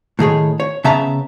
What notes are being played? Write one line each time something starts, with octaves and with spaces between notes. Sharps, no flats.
A2 D#3 G#4 C#5
C#5
C#3 B3 E5 A5 A#5